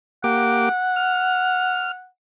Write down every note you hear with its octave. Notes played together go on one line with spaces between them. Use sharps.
A#3 G4 F#5 D6
F6